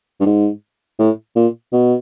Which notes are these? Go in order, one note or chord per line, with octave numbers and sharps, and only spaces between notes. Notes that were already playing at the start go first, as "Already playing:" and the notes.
G2
G#2
A2
A#2
B2